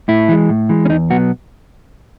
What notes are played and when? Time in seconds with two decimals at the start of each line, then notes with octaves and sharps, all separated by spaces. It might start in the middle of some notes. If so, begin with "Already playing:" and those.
0.08 A2 E4
0.28 E3 G#3
0.49 A2
0.69 E3 G#3
0.85 C#4
0.90 E2 D#4
1.10 B2 F#3 B3 F#4